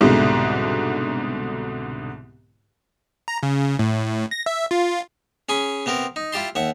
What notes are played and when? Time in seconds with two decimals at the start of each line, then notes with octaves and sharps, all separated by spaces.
0.01 C2 G#2 B2 D3
3.28 A#5
3.43 C#3
3.79 A2
4.31 A#6
4.46 E5
4.71 F4
5.49 C#4 G#4 G#5 B5
5.86 C3 B3 C4 A#4
6.16 D#4
6.32 E4 F4 G4 A5 C6
6.55 D#2 E5 F#5